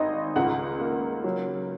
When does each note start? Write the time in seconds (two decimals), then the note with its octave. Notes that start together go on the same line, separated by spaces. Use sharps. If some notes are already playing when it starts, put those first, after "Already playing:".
Already playing: G#1 D#4 D#5
0.36 C#2 F#5
0.80 A#3
1.24 F#3